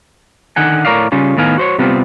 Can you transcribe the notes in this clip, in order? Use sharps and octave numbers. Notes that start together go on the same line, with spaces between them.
D3 D#3 F#5 G#5
A2 A#4 C#5 D5 F5
C#3 G3 C#4 F4
A2 D#3 B3 F5 G#5
F#4 C5 C#5
C3 G3 B3 C4 F4